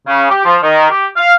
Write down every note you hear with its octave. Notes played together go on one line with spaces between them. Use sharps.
C#3
G4
F3
D#3
G4
F5